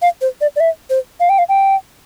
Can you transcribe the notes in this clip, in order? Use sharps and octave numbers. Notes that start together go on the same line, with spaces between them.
F5
C5
D5
D5
E5
C5
F5
G5
F5
G5